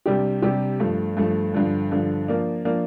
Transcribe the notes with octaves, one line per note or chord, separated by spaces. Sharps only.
C3 G3 D4 G4
C3 G3 D4 G4
G2 F3 A3
G2 F3 A3
G2 D3 F3
G2 D3 F3
F3 A#3 D4
F3 A#3 D4